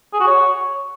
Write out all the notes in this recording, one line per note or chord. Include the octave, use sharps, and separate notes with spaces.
G#4
F#4
C#5